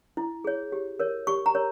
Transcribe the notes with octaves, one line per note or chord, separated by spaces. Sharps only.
E4
G#4 C#5
G4
A#4 C#5
G4 C#6
A#5
A#4 C#5